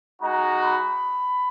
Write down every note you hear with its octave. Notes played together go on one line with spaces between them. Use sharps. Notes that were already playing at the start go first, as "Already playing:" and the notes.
G#3 D#4 F#4 A#5
B5